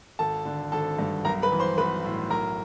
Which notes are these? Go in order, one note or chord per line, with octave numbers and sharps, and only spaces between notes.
G#1 A4 A5
D3
G#1 A4 A5
G2
B1 A#4 A#5
B4 B5
E3
C5 C6
B1 B4 B5
A2
B1 A#4 A#5